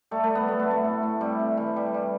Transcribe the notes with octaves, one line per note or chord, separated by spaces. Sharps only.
G3 A3
A3
G3
B3
F#3 A3
B3
C3 A3
A2
A2
C3 G3
C3
E3
G3
G3